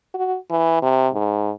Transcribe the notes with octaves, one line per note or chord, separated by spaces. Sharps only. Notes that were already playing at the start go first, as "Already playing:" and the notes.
F#4
E3
C3
G#2